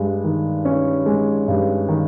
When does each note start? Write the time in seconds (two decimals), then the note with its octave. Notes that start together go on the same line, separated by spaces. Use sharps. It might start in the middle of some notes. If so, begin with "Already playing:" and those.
Already playing: G2 G#3
0.24 D#3
0.65 C#4
1.06 G#3
1.48 G2
1.89 D#3